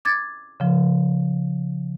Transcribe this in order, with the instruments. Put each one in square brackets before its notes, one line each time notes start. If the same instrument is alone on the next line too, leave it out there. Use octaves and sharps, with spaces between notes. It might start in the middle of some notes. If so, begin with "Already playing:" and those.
[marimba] D6 G#6 A6
C#3 F3